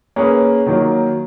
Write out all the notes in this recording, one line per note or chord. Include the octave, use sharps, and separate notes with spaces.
A#3 C#4 G#4 B4
D#3 F#3 A#3